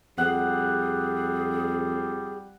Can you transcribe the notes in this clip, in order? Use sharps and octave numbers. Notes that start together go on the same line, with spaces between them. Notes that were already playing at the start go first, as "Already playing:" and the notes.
F2 G3 G#4 F#5